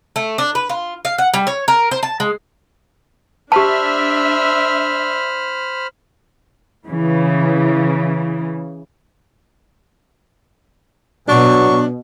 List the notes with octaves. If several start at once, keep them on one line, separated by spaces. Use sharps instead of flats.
A3
D4
B4
F4
F5
F#5
G3
C#5
A#4
C5
A5
G#3
D4 G4 C5 E5 A5 B5 F6
C#3 E3
B2 F#3 D4 C#6